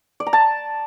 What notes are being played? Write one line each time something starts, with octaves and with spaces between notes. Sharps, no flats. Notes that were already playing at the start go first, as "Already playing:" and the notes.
D5
A#5
A5